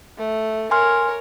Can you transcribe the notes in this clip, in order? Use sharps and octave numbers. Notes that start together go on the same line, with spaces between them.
A3
A#4 C#5 G#5 C6 F6